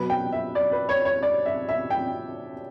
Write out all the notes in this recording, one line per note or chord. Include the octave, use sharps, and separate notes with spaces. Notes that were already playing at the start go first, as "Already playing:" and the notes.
Already playing: B2 F#3 B4
G5
E5
D5
B4
C#5
C#5
D5
E5
E5
G5